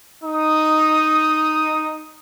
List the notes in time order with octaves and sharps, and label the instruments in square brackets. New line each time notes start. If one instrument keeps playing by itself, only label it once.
[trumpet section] D#4 D#6